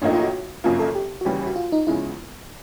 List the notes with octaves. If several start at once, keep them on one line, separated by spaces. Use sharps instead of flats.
A1 A2 F3 A#3 D4 D#4
F4
F#4
G#1 F#2 C#3 F3 A#3 F4
A4
G4
F#4
D#2 C#3 E3 G3 G4
F#4
F4
D#4
E2 C#3 F3 G#3 E4